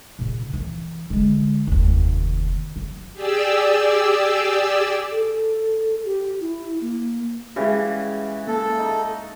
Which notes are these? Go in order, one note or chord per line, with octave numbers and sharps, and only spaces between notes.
A#2 C#3
E3 A#3
D3 G#3
F1 D#2
F#3
G4 G#4 D5 E6
A4
G4
E4
A#3
C#3 E3 G#3 F#4 G4
A#3 A4 A5
D#4